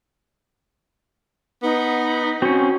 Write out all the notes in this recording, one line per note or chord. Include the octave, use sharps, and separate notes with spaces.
B3 D#4
C4 C#4 F#4